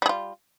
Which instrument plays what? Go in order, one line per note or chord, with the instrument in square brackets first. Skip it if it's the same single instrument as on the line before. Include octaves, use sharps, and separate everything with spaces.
[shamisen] G3
G#4
F4